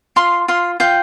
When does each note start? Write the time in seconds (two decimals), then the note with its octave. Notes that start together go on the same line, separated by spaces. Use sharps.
0.16 F4 C6
0.48 F4 C6
0.80 F4 G5